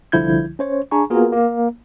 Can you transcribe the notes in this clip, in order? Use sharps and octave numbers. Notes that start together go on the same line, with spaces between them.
C2 D3 F3 E4 G6 G#6
C#4 C5 C#5
D4 G#4 G#5 A#5 C#6
A#3 B3 F4 F#4 G#4 A#4
A#3